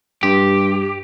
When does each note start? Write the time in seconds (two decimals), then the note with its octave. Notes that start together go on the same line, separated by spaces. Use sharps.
0.23 G2 G4